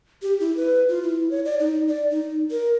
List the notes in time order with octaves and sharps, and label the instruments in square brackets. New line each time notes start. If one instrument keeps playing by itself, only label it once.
[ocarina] G4
E4
B4
F4
E4
C#5
D5
D#4
D5
D#4
A#4